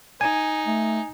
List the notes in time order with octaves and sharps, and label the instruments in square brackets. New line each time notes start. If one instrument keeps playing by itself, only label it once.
[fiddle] D#4 [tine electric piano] G#5
[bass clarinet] A3